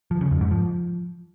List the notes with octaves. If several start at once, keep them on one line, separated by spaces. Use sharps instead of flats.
F3
C#3
F2
G#2
F3